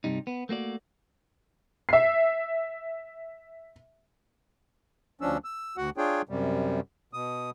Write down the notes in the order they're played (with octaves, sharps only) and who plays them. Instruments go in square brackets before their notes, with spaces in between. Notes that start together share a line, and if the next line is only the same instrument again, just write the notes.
[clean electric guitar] G2 C3 G3 D#4
B3
A3 A#3 F#4 D5
[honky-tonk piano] E5 C7
[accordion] D2 F3 C#4 D4 E6
E6
D2 F#4 F#5
D4 F4 G#4 C#5 G5
F#2 C3 G3
B2 D#6